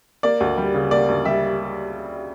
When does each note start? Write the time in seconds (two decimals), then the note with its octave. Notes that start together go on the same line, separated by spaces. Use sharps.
0.23 A#3 D5
0.40 D2
0.58 G3
0.74 C#3
0.91 A#3 D5
1.08 D2
1.25 G3 E5